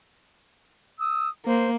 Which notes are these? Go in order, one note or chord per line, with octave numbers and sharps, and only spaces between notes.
D#6 E6
A#3 C5